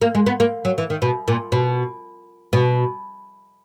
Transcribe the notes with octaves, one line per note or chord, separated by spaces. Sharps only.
A#3
G#3
B3
A#3
F#3
E3
D#3
B2
A#2
B2
B2